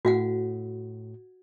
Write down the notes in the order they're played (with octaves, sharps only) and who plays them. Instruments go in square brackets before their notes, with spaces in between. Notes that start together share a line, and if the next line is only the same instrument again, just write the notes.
[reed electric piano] A2 [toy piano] F#4 F5 F#5